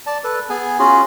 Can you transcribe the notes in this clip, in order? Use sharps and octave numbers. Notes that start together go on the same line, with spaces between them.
D5 A5
A4 B4
B3 G#4 G#5
C#4 F4 F#4 G#4